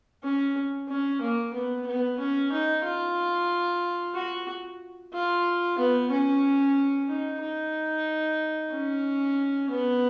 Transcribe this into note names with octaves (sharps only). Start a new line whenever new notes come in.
C#4
C#4
A#3
B3
B3
C#4
D#4
F4
F#4
F4
B3
C#4
D#4
D#4
C#4
B3